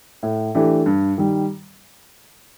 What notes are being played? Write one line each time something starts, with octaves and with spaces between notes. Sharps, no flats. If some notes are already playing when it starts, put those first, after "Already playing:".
A2
E3 A3 D4 G4
G2
D#3 G3